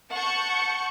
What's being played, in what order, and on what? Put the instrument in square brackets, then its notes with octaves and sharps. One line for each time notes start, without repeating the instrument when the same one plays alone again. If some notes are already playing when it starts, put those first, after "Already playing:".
[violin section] F#5 A5 C#6 G6 C#7